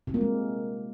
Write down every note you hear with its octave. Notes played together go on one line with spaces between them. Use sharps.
C3
A#3
G#3